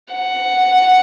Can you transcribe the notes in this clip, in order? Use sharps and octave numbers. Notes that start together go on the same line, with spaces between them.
F#5